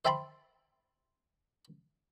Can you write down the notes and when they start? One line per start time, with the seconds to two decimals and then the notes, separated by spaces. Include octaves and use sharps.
0.05 C5 E5 G5 A5 B5 C6